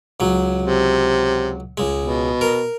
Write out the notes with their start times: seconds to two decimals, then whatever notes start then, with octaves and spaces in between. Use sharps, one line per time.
0.20 C#2 F#3
0.62 C3
1.78 C#2 G#3
2.00 B2
2.41 A#4